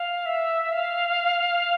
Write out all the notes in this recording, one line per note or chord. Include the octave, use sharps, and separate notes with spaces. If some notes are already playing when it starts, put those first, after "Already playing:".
Already playing: F5
E5
F5